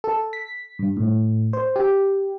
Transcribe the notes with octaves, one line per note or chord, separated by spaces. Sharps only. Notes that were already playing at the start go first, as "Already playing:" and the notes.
A4
B6
G2
A2
C5
G4